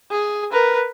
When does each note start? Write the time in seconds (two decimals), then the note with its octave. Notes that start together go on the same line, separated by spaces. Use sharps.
0.11 G#4
0.52 A#4 B4